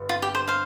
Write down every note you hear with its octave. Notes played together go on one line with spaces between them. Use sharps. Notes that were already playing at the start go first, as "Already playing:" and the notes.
Already playing: G1 G2
F4
G4
C5
C5 F5